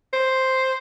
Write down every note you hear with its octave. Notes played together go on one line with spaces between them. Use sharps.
C5